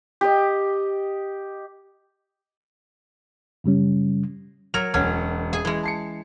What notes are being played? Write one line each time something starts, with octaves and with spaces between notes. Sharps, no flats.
G4 D#5
F#2 C#3 G3 C#4
F#3 A#4 C#5 F7
E1 C#4 F#5
G#4 G#5
E3 G#3
A5 C7 C#7